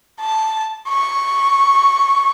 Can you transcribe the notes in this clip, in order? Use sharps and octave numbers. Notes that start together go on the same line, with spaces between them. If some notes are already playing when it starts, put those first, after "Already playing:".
A5
C#6